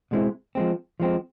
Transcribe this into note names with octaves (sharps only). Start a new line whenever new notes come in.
B2 G#3 C4 E4
F3 G#3 C4
F3 G#3 C4